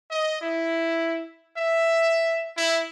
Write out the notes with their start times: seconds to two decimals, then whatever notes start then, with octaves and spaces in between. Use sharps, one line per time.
0.10 D#5
0.41 E4
1.56 E5
2.57 E4